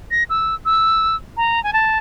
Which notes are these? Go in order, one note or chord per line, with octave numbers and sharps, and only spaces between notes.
A#6
E6
E6
A#5
G#5
A5